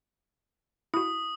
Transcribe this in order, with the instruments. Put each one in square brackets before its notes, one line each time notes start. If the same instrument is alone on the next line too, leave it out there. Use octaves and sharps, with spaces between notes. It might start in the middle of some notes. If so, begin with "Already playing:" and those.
[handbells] E4 F#4 [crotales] D#6